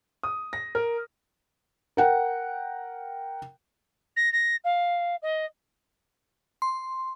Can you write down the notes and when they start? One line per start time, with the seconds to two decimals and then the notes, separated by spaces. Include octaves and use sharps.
0.23 D#6
0.53 A#6
0.75 A#4
1.97 A#4 F#5 G5
4.16 A#6
4.32 A#6
4.64 F5
5.22 D#5
6.62 C6